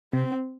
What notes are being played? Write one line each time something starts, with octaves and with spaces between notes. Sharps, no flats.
C3 C4